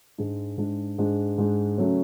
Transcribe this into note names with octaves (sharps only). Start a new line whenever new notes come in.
G#2 G#3 D4
G#2 G#3 D4
G#2 G#3 D4
G#2 G#3 D4
C#3 F#3 A3 C#4